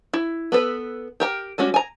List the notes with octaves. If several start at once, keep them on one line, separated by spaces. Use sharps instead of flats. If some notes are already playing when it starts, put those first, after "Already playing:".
E4
B3 A4 B4
G4 A#4 G5
G3 G#3 C#4 F#4
G#5 A#5